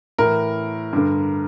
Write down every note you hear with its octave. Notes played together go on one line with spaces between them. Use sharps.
A2 E3 A#4
G2 D3